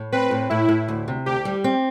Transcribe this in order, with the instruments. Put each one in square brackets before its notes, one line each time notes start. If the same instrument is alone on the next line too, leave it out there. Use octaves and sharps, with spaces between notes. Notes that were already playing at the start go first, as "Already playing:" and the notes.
Already playing: [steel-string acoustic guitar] A2
[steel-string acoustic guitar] C4 [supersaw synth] B4
[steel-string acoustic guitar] A2
[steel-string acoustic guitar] A2 [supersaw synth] E4
[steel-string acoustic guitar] A2
D2
C3
[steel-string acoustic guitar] D2 [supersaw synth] G4
[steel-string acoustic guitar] G3
C4